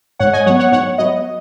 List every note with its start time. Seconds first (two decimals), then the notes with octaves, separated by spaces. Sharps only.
0.19 G#2 C#5 F#5
0.33 D#5 G#5
0.46 F#3 B3 C#5 F#5
0.59 C#5 F#5
0.72 G#2 C#5 F#5
0.98 F#3 B3 D#5